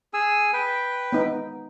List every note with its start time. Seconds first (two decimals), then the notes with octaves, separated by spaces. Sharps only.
0.14 G#4 G#5 E6
0.53 B4 G5
1.12 B3 D#4